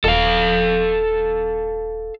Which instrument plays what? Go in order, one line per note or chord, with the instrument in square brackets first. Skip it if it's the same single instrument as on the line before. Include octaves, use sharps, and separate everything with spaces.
[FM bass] D#1 [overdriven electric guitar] A4 F5